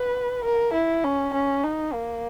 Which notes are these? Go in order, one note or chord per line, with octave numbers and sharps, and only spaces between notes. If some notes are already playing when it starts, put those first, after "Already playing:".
Already playing: B4
A#4
E4
C#4
C#4
D#4
A#3